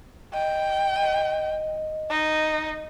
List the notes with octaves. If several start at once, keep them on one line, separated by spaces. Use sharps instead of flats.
D#5 G5
D#5
D#4